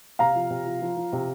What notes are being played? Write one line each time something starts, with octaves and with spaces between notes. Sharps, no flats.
C3 F5 A#5
F3
C3
F3
F3
F3
C3